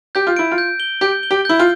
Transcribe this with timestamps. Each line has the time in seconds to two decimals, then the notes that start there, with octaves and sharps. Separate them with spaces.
0.15 G4 G6
0.27 F4
0.37 E4 D7
0.51 F4
0.58 G6
0.80 G7
1.01 G4 G6
1.23 G7
1.31 G4
1.45 E4 G6
1.59 F4